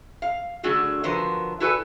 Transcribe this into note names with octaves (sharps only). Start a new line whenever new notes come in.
F5
D3 F#3 A3 F#4 G#4
D3 F3 F#3 B3 A#4 C5
E4 F#4 A4 B4 D5 G#5